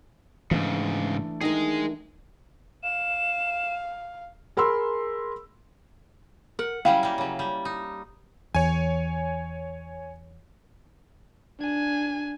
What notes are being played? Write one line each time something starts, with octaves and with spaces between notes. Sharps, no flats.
G#2 C#3 E3 A3 D4
D#3 G#4 A#4 D#5
F5 E7
G#4 A#4 B5 C6 E6
A#4 F#5
F#3 G3 C#4 E4 F5 G5
G3 A#3
C#3 F#3
G3
D#4
E2 C#5 G#5
D4 G#5